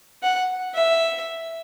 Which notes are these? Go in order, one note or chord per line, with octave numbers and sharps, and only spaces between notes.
F#5
E5